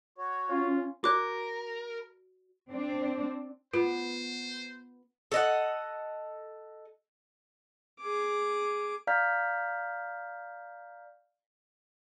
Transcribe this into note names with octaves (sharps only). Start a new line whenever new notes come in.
F#4 C#5
C#4 F4
F#4 A#4 D5 D6 F#6
C4 D4
B3 F4 C5
A4 D#5 F#5
G#4 D6
D5 F5 A#5 F6 G6 B6